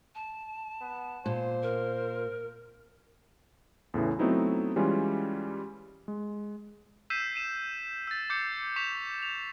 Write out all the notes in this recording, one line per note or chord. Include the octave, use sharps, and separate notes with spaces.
A5
B3
A#2 C5
A#4
E2 A2 C#3 E3
F#3 A3 B3 C4 D#4 E4
E3 G3 G#3 C#4 F4
G#3
E6 G6 B6 C7 D#7 E7
D#7 E7
E6 A6
D6 G6 C7 C#7
C#6 D6 B6 E7 F7
F7